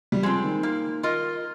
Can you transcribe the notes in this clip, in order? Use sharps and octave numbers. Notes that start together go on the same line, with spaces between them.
G3
F3 G#3 C4
D#3
A#3
F4 A#4 D#5